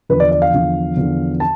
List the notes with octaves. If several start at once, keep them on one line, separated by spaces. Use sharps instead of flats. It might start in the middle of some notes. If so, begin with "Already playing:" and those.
E2 D3 F3 B4
D5
D5
F5
E2 D3 F3
E2 D3 F3
A5